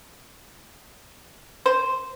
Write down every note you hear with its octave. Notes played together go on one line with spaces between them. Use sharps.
C5